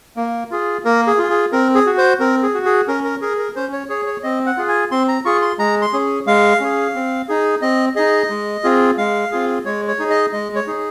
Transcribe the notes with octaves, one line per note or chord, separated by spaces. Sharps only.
A#3
F4 G#4
A#3 A#4
G#4
F4 G#4
G#4
C4 A#4
G#4
F#4
C5
C4 A#4
G#4
F#4
G#4
C#4 A#4
A#4
G#4 A#4
A#4
C#4 C5
C#5
G#4 C#5
C#5
C4 D#5
F#5
F4 G#4
G#5
C4 C6
A#5
F4 G#4 C#6
C6
G#3 A#5
C6
C#4 G#4
G#3 F5
C#4 G#4
C4
D#4 G#4
C4 D#5
D#4 G#4 D#5
G#3
C4 F4 G#4
G#3 F5
C4 F4 G#4
G#3 C#5
C#5
D#4 G#4
D#5
G#3 D#5
C#5
D#4 G#4